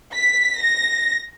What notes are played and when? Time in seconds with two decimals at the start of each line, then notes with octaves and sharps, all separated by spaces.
0.14 B6
0.60 A#6